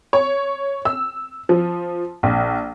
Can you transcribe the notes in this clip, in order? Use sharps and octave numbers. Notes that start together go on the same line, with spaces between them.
C#5
E6
F3
A#1